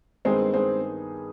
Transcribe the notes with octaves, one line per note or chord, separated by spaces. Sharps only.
G2 D#3 G#3 B3 C4 D#4 G#4
G#3 C4